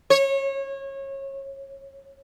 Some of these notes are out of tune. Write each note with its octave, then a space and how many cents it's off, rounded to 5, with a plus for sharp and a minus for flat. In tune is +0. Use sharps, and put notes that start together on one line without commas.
C#5 -25